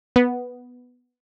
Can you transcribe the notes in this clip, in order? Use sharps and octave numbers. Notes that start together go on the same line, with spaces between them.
B3